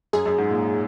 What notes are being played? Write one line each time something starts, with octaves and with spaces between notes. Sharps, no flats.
F#2 G#4
F#2
G#2
A#2